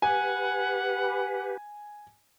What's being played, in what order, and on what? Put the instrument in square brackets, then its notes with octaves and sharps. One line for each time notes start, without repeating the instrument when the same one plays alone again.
[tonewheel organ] G4 B4 [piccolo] F#5 [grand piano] G#5